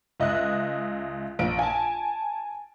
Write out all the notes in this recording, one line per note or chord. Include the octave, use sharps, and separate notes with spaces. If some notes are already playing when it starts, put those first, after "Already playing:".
C#2 D#5 E5 F#6
A#1 D7
G#5 A5